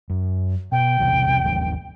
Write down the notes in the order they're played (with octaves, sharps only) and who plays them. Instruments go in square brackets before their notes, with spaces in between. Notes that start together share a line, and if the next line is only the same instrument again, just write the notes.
[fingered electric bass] F#2
[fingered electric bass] B2 [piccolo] G5
[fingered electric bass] B1 E2 C3
G1 D#2 F3